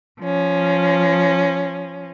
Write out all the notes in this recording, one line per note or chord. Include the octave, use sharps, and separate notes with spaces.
F3 C#4